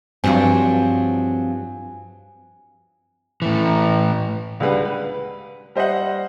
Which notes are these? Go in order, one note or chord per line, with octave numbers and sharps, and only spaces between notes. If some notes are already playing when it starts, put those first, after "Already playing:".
G2 F3 F#3 C4 G#5
A2 E3
C#2 D3 G3 B4 F#5
B4
G3 C5 D#5 E5 F#5